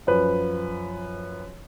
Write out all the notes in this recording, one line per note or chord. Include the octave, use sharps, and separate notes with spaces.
F#2 F3 B4